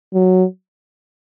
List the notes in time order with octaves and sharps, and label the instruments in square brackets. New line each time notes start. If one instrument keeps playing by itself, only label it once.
[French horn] F#3